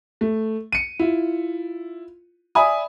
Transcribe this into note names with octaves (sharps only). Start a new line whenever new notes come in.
A3
C#7 D#7
E4 F4
D5 E5 G#5 B5 D#6